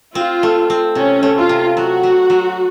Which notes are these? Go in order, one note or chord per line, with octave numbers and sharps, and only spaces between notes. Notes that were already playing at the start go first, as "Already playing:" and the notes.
C4 F4
A3
C4
C3 C#4
A3
F4
C3
F#3 F#4
F#3
F#3